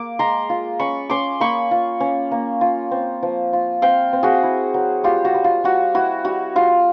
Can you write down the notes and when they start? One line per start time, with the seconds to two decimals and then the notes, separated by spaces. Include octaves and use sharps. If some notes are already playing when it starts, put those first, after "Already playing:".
Already playing: A#3 D6
0.19 G#3 A#5 C6
0.50 F4
0.79 C#4 B5 C#6
1.10 C#4 C6 D6
1.40 A#3 B5 C#6
1.71 F4
2.00 C#4
2.31 A#3
2.61 F4
2.91 C4
3.23 F3
3.53 F4
3.82 C4 F5 G5
4.13 C4
4.23 F#4 G#4
4.43 E4
4.74 F#3
5.04 G3 F4 G4
5.25 F#4
5.34 G3
5.44 F4
5.64 G3 F#4
5.94 E4 F#4
6.25 G3 F#4
6.55 G3 F4